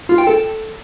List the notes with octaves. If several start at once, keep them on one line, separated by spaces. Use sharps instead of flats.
F4
G5
A4